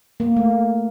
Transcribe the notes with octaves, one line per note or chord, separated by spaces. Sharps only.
A#3
A3